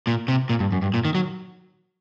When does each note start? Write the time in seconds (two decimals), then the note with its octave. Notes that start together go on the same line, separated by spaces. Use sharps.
0.07 A#2
0.28 C3
0.50 A#2
0.60 G2
0.72 F#2
0.82 G2
0.94 A#2
1.05 D#3
1.15 F#3